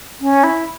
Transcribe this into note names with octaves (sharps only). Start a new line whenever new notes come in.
C#4
E4